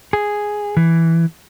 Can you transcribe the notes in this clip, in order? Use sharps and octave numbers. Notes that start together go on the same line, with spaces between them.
G#4
E3